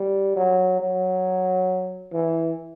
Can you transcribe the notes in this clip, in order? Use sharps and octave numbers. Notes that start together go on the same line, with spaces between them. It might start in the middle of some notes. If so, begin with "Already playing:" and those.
Already playing: G3
F#3
F#3
E3